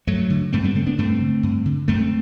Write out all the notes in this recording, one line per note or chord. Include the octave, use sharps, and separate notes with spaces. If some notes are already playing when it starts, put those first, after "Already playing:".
G2 F#3 A3
D3
G2 A3 C4
G3 B3
D3 A3 C4
B3 D4
G2 A3 C4
D3
G2
D3
F#2 A3 C4